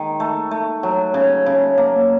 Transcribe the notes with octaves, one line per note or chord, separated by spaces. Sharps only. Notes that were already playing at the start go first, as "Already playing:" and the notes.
Already playing: D#3 G#3
A3
A3
F#3
C#3
C#3
A#3